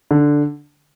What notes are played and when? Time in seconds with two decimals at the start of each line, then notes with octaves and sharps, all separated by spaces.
0.11 D3